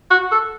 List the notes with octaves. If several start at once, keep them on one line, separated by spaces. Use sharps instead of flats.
F#4
A4